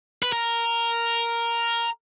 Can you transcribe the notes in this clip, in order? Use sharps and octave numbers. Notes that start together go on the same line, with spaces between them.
B4
A#4